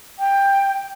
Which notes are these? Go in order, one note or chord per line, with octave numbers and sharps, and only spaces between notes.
G5